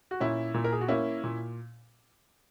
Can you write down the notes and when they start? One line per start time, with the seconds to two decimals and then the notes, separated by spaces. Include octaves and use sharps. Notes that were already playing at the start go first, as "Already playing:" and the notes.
0.11 F#4
0.20 A#2 C#4 E4
0.54 A#2
0.64 A#4
0.72 G#4
0.81 F#4
0.88 A#3 C#4 E4
1.24 A#2